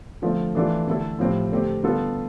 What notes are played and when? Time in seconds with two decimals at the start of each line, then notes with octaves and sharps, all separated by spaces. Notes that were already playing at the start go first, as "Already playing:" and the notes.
0.22 D3 F3 A3 C4
0.55 E3 A3 D4 F4 A4
0.87 D3 A3 E4 A4
1.19 A2 F3 C4 G4
1.51 D3 A3 C4 G4
1.83 D3 G3 B3 F4 A4